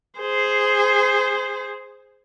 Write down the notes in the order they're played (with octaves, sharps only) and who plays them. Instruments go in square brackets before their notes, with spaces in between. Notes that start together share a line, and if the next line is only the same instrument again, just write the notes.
[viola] G#4 C5